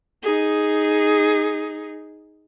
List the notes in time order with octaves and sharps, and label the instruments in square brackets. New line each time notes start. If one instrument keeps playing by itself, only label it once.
[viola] D#4 G#4